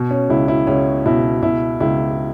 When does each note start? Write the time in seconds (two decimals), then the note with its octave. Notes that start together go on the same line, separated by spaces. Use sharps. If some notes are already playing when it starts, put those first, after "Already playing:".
Already playing: B2
0.10 C#4
0.29 C#2 E4
0.48 E4
0.67 C#2 C#4
1.06 B2 E4
1.43 B2 E4
1.80 C#2 E4